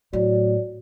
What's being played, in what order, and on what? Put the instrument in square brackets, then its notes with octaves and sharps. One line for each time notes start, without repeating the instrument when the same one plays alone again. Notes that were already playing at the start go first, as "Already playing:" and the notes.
[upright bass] A2 [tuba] F#3 [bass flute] D5